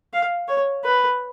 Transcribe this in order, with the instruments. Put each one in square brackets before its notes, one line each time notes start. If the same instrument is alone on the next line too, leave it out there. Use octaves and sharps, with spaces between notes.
[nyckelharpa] F5
C#5
B4